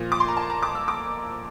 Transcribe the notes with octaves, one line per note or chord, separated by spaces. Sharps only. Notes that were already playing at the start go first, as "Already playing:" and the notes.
Already playing: A#2 F3
D6
C6
A#5
A5
A#5
D6
E6
D6